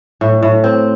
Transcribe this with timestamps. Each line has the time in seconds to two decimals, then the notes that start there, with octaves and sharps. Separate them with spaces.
0.21 A2
0.43 A2
0.64 C4